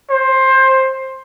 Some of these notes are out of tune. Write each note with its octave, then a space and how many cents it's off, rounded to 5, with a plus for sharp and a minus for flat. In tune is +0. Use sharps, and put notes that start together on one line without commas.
C5 +15